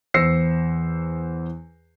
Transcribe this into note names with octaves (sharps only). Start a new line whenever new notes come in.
E2 C5 E6 A#6 C7 C#7